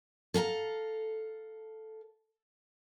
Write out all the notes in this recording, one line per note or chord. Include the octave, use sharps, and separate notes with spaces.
A4 F5 G#5 A#5